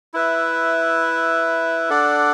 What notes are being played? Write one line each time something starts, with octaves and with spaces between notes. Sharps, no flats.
E4 B4 E5
D4 A4 D5 F#5